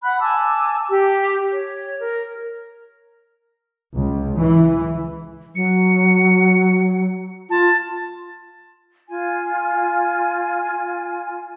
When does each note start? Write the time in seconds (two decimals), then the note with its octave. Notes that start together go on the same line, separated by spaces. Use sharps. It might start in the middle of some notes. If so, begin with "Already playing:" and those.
0.02 F#5 B5 F#6
0.20 G#5 A5 D6 E6
0.89 G4 D6
1.51 C#5
1.98 A#4
3.95 C#2
4.39 E3
5.55 F#3 C#7
7.50 F4 A5
9.10 F4 G#5